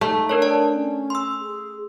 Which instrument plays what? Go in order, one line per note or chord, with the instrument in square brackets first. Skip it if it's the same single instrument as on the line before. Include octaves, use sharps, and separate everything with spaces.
[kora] A3 [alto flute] D#4
[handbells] D4 A#4 C#5
[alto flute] C#5 [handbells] D5 A5
[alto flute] C#4
[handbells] C6 E6
[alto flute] G#4